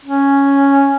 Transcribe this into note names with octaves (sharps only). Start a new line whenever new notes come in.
C#4